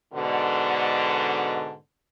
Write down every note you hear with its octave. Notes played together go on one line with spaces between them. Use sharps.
G#2 B2 D3